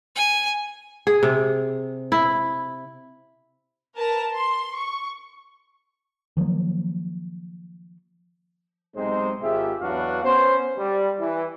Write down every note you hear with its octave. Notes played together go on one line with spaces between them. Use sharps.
G#5
G#4
C3
E4
A#4 B4 A5 A#5
C6
C#6
D#3 F3 F#3 A#3
B1 C3 G#3 C4 D#4 C5
G#1 G#2 F4 G4 G#4 E5
E2 F#3 B3 D4 F#4 F5
B3 C#4 C5
G3
E3